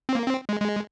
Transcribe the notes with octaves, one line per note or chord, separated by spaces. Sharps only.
C4
A#3
C4
G#3
G#3